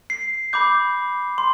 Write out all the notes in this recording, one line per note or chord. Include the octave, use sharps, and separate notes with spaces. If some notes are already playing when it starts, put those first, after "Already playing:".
C7
B5 D6 G6
C6